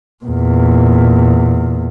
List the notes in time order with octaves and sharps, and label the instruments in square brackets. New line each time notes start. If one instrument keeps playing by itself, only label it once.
[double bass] E2 A#2